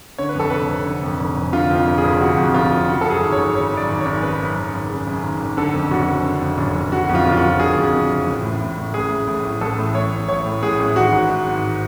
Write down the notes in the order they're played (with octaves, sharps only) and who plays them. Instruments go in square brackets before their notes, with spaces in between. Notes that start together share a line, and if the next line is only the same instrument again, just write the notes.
[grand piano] D3 C#5
B4
F2 A4
F1 B4
F1
D3
F2
F1
F1
D3 F4
F2
F4
F1
G#4
F1
D3 F#4
F2
F1 F4
F1
C#3 F#4
F#2 A4
G#4
G#1
C#5
G#1
C#3 C#5
F#2 D5
G#1
C#5
G#1
C#3 B4
F#2
G#1
G#1
C#3
F#2
G#1
G#1
D3 A4
F2
F#1 F#4
F#1
D3
F2
F#1
F#1
D3 F#4
F2
F4
F#1
F4
F#4
F#1
D3 G#4
F2
F#1
F#1
A1
A2
A2
A1
A1 G#4
A2
A2
A1
A1 A4
A2
A2 C#5
A1
A1 C#5
A2
A2 G#4
A1
G#1 F#4
G#2
G#2
G#1